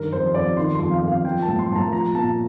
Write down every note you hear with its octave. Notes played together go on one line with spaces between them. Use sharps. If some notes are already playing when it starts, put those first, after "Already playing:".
Already playing: G2 D#3 A#4
F2 C5
F2 D5
D#3 C6
F2 C6
F5
F2
F5
F3 G5
A5
A2
C6
A2 A5
A#5
F3 A#5
A#2 A5